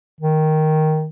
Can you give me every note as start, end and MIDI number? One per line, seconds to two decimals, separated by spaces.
0.20 1.09 51